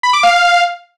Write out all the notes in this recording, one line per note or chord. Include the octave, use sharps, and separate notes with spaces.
B5
D6
F5